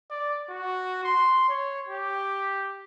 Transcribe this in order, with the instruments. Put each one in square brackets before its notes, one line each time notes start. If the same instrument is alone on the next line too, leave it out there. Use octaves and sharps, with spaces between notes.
[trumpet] D5
F#4
C6
C#5
G4